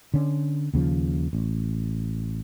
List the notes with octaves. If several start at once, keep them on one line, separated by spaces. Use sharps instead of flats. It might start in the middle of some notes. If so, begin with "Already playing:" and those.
D3 C#4
D#2 C#3 F3
A1